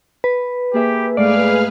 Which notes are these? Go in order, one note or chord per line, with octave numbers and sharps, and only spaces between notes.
B4
A#3 G4 G#4 E5
G#2 A3 G#4 B4 D5 F5 F6